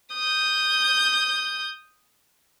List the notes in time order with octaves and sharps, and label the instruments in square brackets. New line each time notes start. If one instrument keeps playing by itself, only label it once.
[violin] D#6 G6